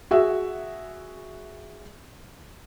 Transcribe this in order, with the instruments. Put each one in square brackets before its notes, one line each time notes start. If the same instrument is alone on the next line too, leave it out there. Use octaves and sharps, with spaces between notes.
[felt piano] F#4 G#4 E5